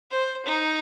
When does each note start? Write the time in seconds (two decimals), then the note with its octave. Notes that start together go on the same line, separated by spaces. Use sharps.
0.11 C5
0.45 D#4